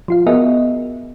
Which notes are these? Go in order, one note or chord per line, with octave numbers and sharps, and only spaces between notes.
F3 F4 F5
B3 F#4 G#4 A#4 D#5 E5